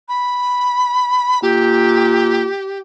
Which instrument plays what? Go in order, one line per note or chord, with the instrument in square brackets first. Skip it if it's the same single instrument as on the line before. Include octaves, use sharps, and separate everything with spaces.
[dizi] B5
[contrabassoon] A#2 [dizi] G4